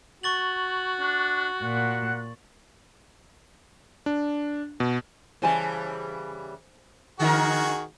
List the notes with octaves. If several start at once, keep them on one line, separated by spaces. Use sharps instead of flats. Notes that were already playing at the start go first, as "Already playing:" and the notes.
F#4 C#6 A6 F#7
D4
A#2 F#5
D4
B2
C#3 E3 G3 C5 G#5 A5
D3 D#3 D#4 F#4 G#4 A#4